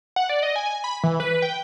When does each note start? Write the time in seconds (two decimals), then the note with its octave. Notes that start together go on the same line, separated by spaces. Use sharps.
0.16 F#5
0.29 D5
0.43 D#5
0.56 G#5
0.84 B5
1.03 E3
1.20 B4
1.42 G5